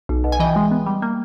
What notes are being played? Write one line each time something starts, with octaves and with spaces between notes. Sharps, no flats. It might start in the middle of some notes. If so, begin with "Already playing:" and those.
B1
B2
G#5
E3 D#5 G5
G#3
B3
G3
A#3